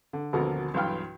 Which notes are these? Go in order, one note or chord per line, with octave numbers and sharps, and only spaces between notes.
D3
G#1 D2 B2 D3 F3 A#4
B1 G2 E3 F5 G5 F6